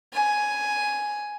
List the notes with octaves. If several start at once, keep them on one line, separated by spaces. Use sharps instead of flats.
G#5